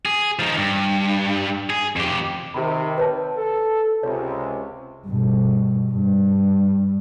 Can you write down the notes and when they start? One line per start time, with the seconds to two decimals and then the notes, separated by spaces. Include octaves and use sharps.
0.06 G#4
0.39 F3 D#4
0.57 G2
1.70 G#4
1.96 F2 G4
2.54 C3 D#3 G4 B5
2.98 B4 C#5 A5
3.35 A4
4.03 C#2 C3 C#5
5.07 G2 B2
5.91 G2